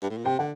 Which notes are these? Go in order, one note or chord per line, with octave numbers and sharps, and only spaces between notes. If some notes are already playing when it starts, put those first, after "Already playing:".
G2
A2
A#2
C3 G5
D3 F#5